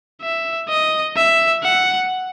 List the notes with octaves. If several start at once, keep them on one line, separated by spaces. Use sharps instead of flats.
E5
D#5
E5
F#5